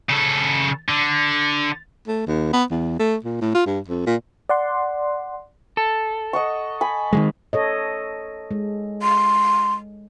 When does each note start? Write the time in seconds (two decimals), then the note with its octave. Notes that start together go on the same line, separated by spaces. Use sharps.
0.10 C#3 A4
0.89 D3
2.08 A3
2.27 D#2
2.53 B3
2.71 E2
2.99 A3
3.25 A#2
3.41 A2
3.54 F4
3.66 G2
3.89 F2
4.07 A#2
4.49 D5 F#5 C6
5.77 A4
6.33 D#5 F#5 C#6
6.81 G#5 B5
7.13 D#3 E3 G#3
7.53 A4 C#5 D#5
8.51 G#3
9.02 C6